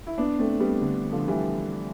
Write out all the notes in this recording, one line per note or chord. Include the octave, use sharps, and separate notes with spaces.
E4
B3 D4
A3 C4
G3 B3
D3
D3 F3
E3 G3